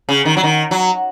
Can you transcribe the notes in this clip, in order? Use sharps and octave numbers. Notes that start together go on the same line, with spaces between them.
C#3
D#3
F#3
D#3
F#3